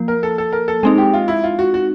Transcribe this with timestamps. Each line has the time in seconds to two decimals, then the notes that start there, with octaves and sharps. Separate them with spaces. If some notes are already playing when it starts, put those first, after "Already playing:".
Already playing: F3 A#3
0.08 A#4
0.23 A4
0.38 A4
0.53 A#4
0.68 A4
0.83 G#3 C4 D#4 G#4
0.98 G4
1.13 F4
1.28 E4
1.43 F4
1.59 F#4
1.74 F#4